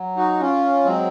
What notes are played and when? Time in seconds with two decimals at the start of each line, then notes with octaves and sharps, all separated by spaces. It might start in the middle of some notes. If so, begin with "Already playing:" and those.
Already playing: F#3
0.16 D#4 F#4
0.40 C#3 C#4 F4
0.85 F#3 G#3 C4